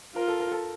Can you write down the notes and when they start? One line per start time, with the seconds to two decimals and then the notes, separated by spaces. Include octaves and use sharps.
0.15 F4 A#4
0.28 A4
0.40 A#4
0.52 A4